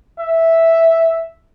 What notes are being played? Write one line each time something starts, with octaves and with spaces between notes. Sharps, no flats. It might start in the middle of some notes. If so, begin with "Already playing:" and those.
E5